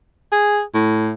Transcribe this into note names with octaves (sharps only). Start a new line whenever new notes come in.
G#4
A2